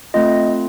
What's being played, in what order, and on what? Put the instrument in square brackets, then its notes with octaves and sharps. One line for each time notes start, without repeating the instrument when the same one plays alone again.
[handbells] A3 C4 F4 D#5